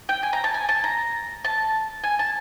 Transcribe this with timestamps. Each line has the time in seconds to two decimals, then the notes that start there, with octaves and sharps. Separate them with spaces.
0.09 G5
0.23 G#5
0.33 A#5
0.44 A5
0.54 G#5
0.69 A5
0.84 A#5
1.45 A5
2.04 G#5
2.19 A5